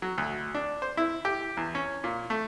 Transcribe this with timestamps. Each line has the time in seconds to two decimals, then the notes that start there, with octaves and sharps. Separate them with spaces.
0.02 F#3
0.18 D2
0.54 D4
0.82 C5
0.97 E4
1.25 G4
1.57 E2
1.75 C#4
2.04 A#2
2.30 A3